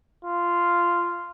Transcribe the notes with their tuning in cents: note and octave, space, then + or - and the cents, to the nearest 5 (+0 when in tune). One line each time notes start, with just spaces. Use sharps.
F4 -10